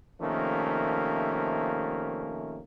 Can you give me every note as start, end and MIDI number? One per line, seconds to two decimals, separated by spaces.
0.21 2.61 48
0.21 2.61 51
0.21 2.61 53
0.21 2.61 57
0.21 2.61 58
0.21 2.61 61